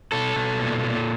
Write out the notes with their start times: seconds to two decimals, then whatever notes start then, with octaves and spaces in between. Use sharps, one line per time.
0.12 B2 A4
0.36 B2
0.59 A#2
0.84 A#2